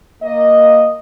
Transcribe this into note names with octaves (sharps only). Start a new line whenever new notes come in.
A#3 D#5